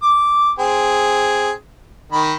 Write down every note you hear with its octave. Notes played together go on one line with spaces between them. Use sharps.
D6
C4 G#4
D#3 B5